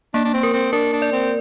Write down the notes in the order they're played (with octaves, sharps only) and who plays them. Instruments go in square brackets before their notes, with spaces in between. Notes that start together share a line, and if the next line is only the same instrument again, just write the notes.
[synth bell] A#3 [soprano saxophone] D4
[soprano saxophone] D4
C4
[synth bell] A#4
[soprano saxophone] C4
[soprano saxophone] D4 [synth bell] A#4
[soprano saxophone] D4
[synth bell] D5
[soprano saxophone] C4